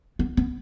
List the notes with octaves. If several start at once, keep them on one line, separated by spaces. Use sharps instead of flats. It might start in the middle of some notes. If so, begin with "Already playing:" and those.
B3
B3